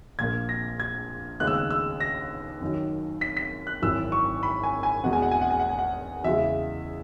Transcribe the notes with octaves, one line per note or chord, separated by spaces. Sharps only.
A#1 A#2 A#3 G#6
A#6
G#6
D#2 C#3 G#3 B3 F#6
E6
F#6
E6
A#6
F#2 D#3 F#3
B6
B6
F#6
G#1 F#2 E3 E6
C#6
B5
G#5
G#5
E2 B2 G#3 B3 F#5
G#5
F#5
G#5
F#5
G#5
F#5
G#5
F#5
E2 C#3 E3 G#3 E5